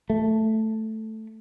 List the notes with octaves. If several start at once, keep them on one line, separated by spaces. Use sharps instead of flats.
A3